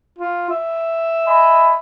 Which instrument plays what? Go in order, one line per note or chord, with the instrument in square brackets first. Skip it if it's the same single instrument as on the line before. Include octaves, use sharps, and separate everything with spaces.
[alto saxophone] F4
E5
[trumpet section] D#5 G#5 B5